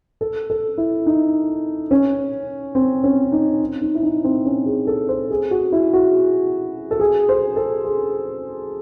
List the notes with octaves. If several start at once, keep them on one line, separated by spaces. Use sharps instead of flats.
A4
A4
E4
D#4
C#4
C4
C#4
D#4
D#4
E4
D#4
C4
C#4
G#4
A4
C5
G#4
F#4
E4
F#4
A4
G#4
C5
A4
G#4